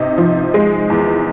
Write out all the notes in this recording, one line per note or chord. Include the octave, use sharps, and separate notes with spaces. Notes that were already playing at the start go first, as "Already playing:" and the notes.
Already playing: C3 D#4
F3
G#3
E2